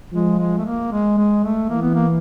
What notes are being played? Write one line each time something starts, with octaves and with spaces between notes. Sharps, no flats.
F3 G#3
G#3
A3
A#3
G#3
G#3
A3
E3 A#3
B3
A#3